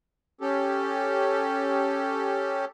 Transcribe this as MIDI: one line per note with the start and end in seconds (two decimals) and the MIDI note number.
0.41 2.65 61
0.41 2.65 67
0.41 2.65 69